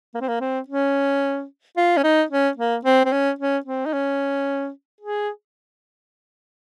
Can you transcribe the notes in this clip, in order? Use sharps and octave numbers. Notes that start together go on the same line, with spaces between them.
A#3
C4
A#3
C4
C#4
F4
C#4
D#4
C#4
A#3
C4
C4
C#4
C#4
C4
D#4
C#4
G#4